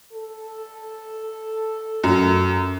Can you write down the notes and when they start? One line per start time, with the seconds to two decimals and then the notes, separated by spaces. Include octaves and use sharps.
0.13 A4
2.04 F#2